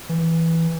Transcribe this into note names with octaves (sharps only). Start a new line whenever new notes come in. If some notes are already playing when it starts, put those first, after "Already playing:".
E3